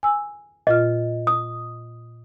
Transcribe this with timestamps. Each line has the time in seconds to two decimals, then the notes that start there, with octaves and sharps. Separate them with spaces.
0.03 G#5 E6
0.67 A#2 F4 D#5 F6
1.27 D#6